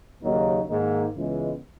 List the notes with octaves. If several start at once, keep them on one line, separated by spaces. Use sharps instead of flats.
D#2 C#3 F#3 A#3 D#4
G#2 D#3 A#3 D#4
C#2 C#3 E3 G#3 B3